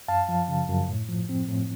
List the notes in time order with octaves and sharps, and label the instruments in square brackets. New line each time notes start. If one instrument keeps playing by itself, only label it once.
[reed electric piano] F#2 F5 A5
F3
C#3
F#2
A2
F3
C4
A2